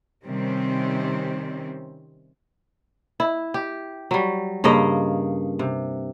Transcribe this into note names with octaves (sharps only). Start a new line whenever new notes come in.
C3 D#3 G3 C4 C#4
E4
G4
F#3 G3
G2 C#3 A#3 D#5
C3